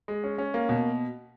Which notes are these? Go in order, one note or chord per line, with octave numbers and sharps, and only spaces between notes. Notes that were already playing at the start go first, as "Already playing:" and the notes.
G#3
C#4
C#4
A#3
B2